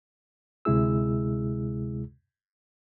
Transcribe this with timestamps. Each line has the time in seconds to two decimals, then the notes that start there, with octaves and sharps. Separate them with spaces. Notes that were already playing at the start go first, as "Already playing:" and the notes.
0.65 D2 C3 G#3 E4 G#4 E6